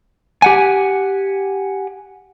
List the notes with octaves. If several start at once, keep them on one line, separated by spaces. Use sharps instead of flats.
G4 F#5 G#5